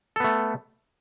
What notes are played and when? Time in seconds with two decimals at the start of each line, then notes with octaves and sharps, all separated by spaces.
0.16 A4
0.20 B3
0.24 A3